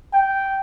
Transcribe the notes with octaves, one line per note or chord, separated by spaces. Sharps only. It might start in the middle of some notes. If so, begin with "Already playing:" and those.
G5